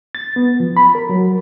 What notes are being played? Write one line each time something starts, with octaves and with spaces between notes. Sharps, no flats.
A6
B3
F3
B5
A#4
F#3